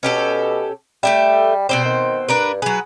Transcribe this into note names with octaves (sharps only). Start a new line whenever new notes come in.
B2 C#4 G4 A4
G3 A3 G4 E5
B2 G3 C4 C5
D#3
G2 D4 A#4 B4
F#3 G#4 B4